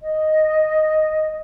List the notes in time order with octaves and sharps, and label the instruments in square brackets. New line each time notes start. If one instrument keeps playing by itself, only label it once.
[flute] D#5